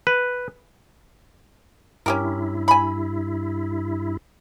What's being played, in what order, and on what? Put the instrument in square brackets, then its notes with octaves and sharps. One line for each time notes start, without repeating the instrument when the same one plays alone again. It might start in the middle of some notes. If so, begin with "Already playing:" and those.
[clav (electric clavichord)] B4
[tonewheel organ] G2 E4 [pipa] C#4 G4 A#4
[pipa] G#5 B5